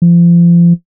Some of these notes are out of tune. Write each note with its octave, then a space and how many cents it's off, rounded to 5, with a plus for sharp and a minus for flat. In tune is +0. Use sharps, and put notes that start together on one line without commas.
F3 -30